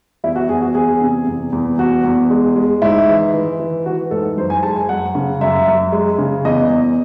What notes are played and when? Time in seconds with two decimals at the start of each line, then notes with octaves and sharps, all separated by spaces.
0.24 E2 E4
0.36 F#4
0.49 E2 G#4
0.62 F#4
0.75 E2 G#4
1.01 C3
1.27 E2
1.52 E2
1.78 E2 F#4
2.04 E2
2.30 G#3
2.56 G#3
2.82 G#2 E4
3.08 E3
3.34 E3
3.60 E3
3.86 E3 F#4
4.11 G#2 A4
4.37 F#2 C5
4.50 G#5
4.63 G#3 A5
4.76 G#5
4.89 F#2 F#5
5.15 C#3
5.41 F#2 E5
5.67 F#2
5.92 G#3
6.18 C#3
6.45 E2 D#5
6.70 E2